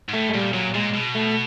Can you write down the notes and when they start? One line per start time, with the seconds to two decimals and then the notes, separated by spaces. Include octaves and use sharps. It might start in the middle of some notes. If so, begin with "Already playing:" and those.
0.09 G#2
0.13 A2 A3
0.29 G#3
0.34 A#2 G3
0.54 A#2 F#3
0.74 A#2 G#3
0.94 B2
1.15 A3